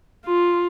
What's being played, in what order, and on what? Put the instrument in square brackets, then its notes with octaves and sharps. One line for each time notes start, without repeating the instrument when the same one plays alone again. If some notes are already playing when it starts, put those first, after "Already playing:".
[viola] F4